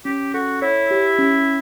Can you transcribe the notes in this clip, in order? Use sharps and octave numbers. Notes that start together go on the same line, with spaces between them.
C#4 G4
F#4 A4
E4 C#5
G4
C#4